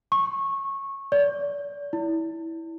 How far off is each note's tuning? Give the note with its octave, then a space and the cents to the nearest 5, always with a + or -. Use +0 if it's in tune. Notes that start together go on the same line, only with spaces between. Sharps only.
C#6 -15
D5 -35
E4 -15